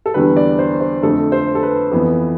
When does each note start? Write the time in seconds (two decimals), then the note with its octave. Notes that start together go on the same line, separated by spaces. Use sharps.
0.06 A4
0.14 E2 D3 G3 B4
0.36 D5
0.59 C5
0.81 C5
1.02 F2 D3 A3 A4
1.32 C5
1.55 A4
1.63 B4
1.91 F2 E3 B3